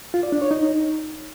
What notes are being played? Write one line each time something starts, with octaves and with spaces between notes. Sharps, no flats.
F4
D5
D4
C#5
D#4